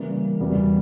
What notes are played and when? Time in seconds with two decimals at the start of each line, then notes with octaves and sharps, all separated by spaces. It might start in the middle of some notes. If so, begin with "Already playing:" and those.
Already playing: C#3 E3 G3 A#3
0.40 E2 C#3 G3 B3 F#4